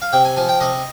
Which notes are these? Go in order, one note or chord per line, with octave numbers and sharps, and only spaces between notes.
F5
C3 G5
G#5
F3 G#5
G5
C3 D#5